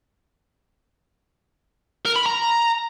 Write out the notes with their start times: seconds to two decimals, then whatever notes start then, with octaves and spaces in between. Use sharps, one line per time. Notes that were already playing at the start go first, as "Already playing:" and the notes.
2.06 A#4
2.16 B5
2.26 A#5